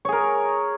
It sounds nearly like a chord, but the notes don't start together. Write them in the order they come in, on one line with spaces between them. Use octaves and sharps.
C#5 G#4 A#4